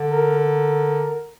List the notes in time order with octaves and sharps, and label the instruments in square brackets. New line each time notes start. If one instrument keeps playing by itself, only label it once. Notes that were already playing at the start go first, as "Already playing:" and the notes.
Already playing: [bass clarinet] D3
[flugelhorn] A#4
A#4